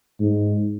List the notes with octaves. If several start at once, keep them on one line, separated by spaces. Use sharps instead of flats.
G#2